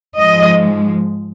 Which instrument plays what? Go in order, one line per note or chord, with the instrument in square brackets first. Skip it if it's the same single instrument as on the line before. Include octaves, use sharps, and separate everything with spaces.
[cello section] G#2 F3 G#3 D#5